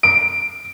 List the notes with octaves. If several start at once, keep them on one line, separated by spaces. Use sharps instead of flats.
D7